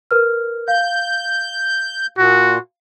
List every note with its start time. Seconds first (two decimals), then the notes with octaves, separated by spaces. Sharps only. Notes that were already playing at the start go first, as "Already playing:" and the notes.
0.11 A#4 B4 F6
0.68 F5 G6
2.18 A#2 F#4